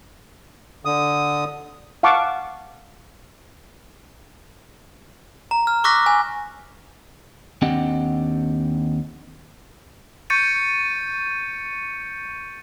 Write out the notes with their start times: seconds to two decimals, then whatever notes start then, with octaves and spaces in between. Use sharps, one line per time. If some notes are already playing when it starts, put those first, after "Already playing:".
0.85 D3 D#6
2.03 F5 F#5 A5 C#6 D6
5.51 A#5
5.67 F6
5.84 C#6 D6 E6 F#6 A#6 B6
6.06 G#5
7.62 D#2 C4 D4 G4 D#5 F#5
10.30 C#6 G6 A6 C#7 D#7